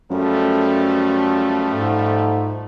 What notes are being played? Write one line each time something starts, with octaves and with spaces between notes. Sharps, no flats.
F#2 F3 G3 A3
G#2